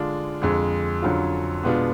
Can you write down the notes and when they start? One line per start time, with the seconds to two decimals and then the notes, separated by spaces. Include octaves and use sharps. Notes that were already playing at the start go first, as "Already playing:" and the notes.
Already playing: D3 G#3 D4 F4
0.41 F2 D3 G#3 G#4
1.02 F2 D3 F#3 C#4 F4
1.63 B2 G#3 B3 D4 F4